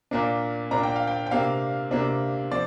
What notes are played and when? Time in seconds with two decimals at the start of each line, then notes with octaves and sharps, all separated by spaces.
0.11 A#2 A#3 D4
0.71 A#2 A#3 D4 A#5
0.83 G5
0.96 F5
1.07 G5
1.26 G5
1.31 C3 A#3 D4 F5
1.91 C3 A#3 D4
2.51 F3 C4 D5